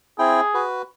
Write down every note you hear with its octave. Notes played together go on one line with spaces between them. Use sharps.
C4 E4 G#4 G5
F#4 B4